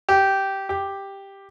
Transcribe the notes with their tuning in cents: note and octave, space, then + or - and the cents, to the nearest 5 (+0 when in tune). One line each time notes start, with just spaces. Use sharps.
G4 -10
G4 +5